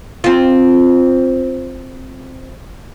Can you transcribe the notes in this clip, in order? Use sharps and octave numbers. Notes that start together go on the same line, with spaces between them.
C4 F4